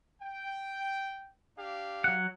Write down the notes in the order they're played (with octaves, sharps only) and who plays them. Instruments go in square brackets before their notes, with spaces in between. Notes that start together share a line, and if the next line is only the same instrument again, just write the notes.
[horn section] G5
D4 G4 F5
[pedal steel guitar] F#3 F#5